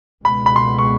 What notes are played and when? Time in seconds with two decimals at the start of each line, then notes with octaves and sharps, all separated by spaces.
0.24 C#2 B2 G#3 B3 B5
0.46 B5
0.56 C6
0.79 C#6